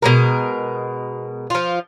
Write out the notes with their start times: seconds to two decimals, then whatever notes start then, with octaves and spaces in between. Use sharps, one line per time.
0.02 B2 G#3 A#4
1.50 F3 F4